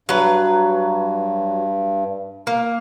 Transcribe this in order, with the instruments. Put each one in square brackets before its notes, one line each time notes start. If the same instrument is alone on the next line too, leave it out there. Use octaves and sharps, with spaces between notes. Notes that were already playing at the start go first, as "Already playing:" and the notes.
[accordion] G2 [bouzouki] F#3 B4
[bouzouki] A#3